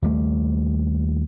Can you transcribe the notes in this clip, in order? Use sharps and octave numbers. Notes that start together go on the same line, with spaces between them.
D#2 G3 A3